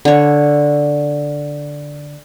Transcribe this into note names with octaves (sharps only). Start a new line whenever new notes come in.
D3 C#5